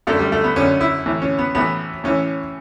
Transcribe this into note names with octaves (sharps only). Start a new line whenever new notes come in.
F#2 D3 A3
G3
A3
B3
F#2 D3 C#4
E4
A2 E3
C#4
B3
A2 E3 B3
A2 E3 C#4